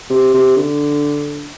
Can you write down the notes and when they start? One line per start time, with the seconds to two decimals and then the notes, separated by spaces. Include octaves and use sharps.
0.10 C3
0.34 C3
0.56 D3